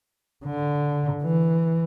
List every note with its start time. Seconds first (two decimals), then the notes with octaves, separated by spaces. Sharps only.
0.46 D3
1.22 E3